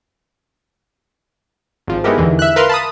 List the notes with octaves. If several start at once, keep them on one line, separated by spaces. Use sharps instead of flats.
G#1 F3
G#3 B3 D#4 E4 G4 A#4
E2 D3 E3
E5 F#6
A#4 B4 F5 C6
A5 B5 D#6